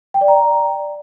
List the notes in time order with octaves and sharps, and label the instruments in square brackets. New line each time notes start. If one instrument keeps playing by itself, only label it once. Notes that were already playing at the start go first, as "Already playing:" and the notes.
[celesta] G5
D5
A#5